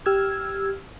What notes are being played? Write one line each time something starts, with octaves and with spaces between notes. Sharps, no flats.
G4 E6 F6 G#6